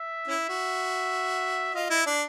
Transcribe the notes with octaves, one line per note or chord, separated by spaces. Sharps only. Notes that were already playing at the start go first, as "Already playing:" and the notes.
Already playing: E5
C#4 E4
F#4
F4 D#5
E4
D4